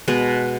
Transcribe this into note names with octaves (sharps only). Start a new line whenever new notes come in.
B2 G#3 B3 B4